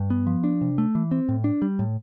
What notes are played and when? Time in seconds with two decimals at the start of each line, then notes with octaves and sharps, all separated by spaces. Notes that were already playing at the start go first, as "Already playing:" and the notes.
Already playing: G2
0.10 B3
0.27 F3
0.44 D4
0.61 C3
0.78 A3
0.95 E3
1.11 C4
1.29 A2
1.44 D4
1.62 G3
1.79 A2